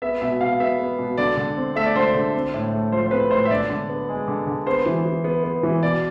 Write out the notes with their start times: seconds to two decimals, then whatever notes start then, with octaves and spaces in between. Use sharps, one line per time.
0.02 B3 E5
0.21 B2 E5
0.41 B2 F5
0.60 B3 E5
0.79 B3
0.99 B2
1.18 D3 D5
1.37 D3
1.57 C4
1.76 A3 E5
1.86 D5
1.95 D3 C5
2.05 D5
2.15 D3
2.34 C4
2.54 A2
2.73 A3
2.92 F3 C5
3.06 C5
3.11 C4 B4
3.31 A2 C5
3.45 E5
3.50 D3 D5
3.69 D3
3.89 B3
4.09 G#3
4.28 D3
4.47 D3
4.66 B3 C5
4.86 E3
5.05 E3
5.24 B3
5.44 B3
5.63 E3
5.82 B2 D5